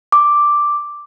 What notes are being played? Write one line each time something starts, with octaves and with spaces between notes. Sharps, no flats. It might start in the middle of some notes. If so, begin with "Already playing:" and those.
D6